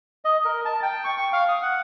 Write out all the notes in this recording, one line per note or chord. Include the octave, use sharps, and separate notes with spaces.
D#5
A#4
A5
G5
C#6
C#6
F5
D#6
F#5